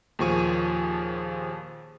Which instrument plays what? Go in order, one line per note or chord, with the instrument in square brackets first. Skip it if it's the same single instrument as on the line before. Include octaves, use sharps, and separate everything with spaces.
[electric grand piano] D#2 A#2 F3 G#4 C#6 D#7